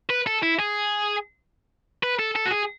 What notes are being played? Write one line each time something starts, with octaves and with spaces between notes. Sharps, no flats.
B4
A4
E4
G#4
B4
A4
A4
F#4
G#4